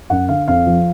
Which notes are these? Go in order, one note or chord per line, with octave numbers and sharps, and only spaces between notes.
F#2 F#5
D3 F5
F2 F5
F3